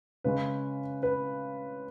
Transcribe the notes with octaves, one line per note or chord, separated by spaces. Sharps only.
C#3 G#3 C#4 B4
B4